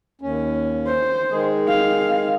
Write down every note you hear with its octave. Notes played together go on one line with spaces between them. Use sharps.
D#2 C#4
C5
D#3 G#3 G#4
F5